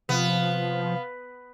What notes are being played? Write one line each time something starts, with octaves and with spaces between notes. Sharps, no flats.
C3 F3 B3 F5